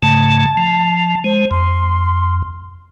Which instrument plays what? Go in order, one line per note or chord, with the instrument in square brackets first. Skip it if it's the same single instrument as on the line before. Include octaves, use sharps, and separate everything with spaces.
[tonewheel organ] G#2 C#3 A3 [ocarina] A5
[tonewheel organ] F3
[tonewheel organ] G#3 [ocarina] C5
[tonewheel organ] F2 [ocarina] C6